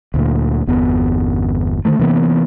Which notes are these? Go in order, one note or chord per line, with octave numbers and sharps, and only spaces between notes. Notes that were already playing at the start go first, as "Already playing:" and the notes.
D2 A#2 D3
G1 E2 B3
D3 D#3 A3
C3 E3 A#3 B3